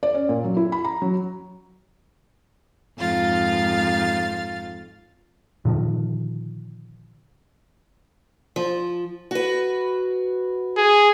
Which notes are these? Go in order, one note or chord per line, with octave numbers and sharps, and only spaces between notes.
D5
C#4
A#2
F#3
E4
B5
A#5
F#3
F2 G#2 F4 F5 A6
A#2 D3 D#3 F3
F3
F#4 B4
G#4